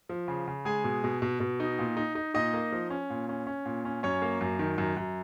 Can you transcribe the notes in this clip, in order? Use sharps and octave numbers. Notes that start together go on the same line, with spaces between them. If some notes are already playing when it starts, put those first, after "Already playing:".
F3
C#3
C#3
G#3 G#4 G#5
B2
B2
B2
B2
D#4
A#2
D#4
D#4
A#2 D#4 D#5
A#3
F3
C#4
A#2
C#4
C#4
A#2
C#4
F#2 C#4 C#5
A#3
F#2
D#3
F#2
F#2